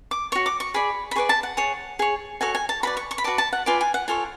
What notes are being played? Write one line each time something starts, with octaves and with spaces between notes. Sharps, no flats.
D6
F#4 C#5 C#6
D6
C#6
G#4 D5 B5
B5
G#4 B4 D5 C#6
A5
F#5
G#4 C#5
G#4 C#5
F#4 A4 C#5 G#5
G#5
A5
F#4 B4 D5 B5
C#6
C#6
B5
F#4 B4 D5 A5
A5
F#5
F4 B4 D5 G#5
G#5
F#5
F4 A4 C#5 G#5